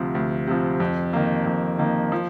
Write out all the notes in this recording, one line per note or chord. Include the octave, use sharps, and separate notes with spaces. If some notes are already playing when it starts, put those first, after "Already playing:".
Already playing: D2 C3 F3
D2
C3 F3
F2
D#3 A#3
F2
D#3 A#3
F3